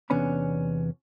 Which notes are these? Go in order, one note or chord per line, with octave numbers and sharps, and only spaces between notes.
E2 C3 B3 C#4 D4 B5